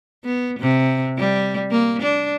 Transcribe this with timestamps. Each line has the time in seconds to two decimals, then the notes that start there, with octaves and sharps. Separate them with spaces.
0.24 B3
0.60 C3
1.18 G3
1.71 A#3
2.03 D4